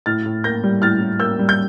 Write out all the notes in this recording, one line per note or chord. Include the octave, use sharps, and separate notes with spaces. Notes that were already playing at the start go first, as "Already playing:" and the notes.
A2 F6 A6
A2
A#3 G6 A#6
G3
A2 F6 A6
A2
A#3 E6 G6
G3
G6